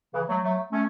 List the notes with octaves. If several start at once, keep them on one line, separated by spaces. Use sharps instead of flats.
C#3 E3
F#3 A3
F#3 A3
A3 C#4